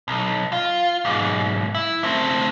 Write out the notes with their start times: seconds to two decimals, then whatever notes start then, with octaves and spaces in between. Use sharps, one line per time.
0.08 B1
0.52 F4
1.05 B1 G#2
1.75 E4
2.04 A3 C4